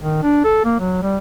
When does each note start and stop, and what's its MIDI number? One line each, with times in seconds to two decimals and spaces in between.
0.01 0.22 51
0.23 0.43 62
0.44 0.60 69
0.65 0.77 58
0.80 0.98 54
1.02 1.17 55